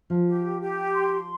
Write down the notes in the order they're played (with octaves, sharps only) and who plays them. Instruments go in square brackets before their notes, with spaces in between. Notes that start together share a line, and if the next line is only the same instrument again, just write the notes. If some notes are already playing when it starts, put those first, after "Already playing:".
[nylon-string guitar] F3
[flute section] G4
G4
C6